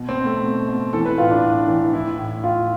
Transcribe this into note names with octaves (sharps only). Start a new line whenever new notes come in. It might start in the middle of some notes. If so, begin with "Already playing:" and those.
Already playing: B2
C4
B2
A3
B2
B2
E3 A4
B4
A2 F4
D4
A2
E3
E3 E4
A2
A2 F4